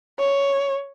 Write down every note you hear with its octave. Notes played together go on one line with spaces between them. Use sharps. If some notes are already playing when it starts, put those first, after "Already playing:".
C#5